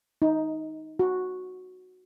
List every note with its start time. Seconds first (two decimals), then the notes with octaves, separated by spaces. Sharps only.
0.22 D#4
0.99 F#4